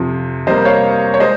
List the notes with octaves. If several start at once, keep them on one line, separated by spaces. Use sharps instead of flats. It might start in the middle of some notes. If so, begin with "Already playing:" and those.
Already playing: F2 C3 F3
C3 G3 A#3 C5 D#5
C#5 F5
C#5
G#3 C5 D#5